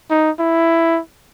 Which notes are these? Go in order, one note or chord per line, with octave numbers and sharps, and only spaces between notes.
D#4
E4